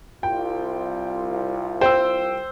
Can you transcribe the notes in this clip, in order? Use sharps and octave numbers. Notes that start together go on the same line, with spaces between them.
C2 F4 G5
C5 G5 E6